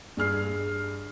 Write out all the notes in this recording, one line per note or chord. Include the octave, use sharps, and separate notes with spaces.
G2 G#4 F6 C7